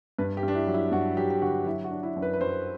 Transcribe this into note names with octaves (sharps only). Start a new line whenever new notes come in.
G2 B4
G4
G2 D4
E4
F#3
E4
G2 F#4
F#3 G4
G4
D3 F#4
F#3 E4
F#4
D4
E4
F#2
B4
B4
F#2 C5